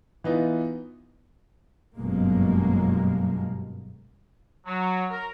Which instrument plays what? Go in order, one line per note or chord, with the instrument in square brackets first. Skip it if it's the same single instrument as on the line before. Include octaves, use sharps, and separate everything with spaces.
[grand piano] E3 B3 D#4 F4
[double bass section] G1 F#2 B2 G#3 A#3
[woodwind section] F#3
A#4